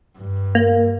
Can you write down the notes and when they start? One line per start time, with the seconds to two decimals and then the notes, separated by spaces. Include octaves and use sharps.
0.18 G2
0.55 A#3